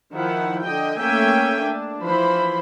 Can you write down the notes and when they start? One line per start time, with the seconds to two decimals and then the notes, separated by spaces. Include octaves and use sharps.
0.12 D#3 F3 E4 F#5
0.63 D3 D#5 G5
0.99 A3 A#3 C#4 E5 G5 G#5
1.63 D4
2.01 E3 F3 C5 B5